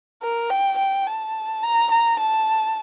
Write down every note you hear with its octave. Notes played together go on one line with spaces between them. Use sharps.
A#4
G5
G5
A5
A#5
A#5
A5